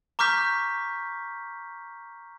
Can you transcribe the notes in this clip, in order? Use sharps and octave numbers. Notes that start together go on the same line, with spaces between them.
A#5 C#6 D6 F6 G6 B6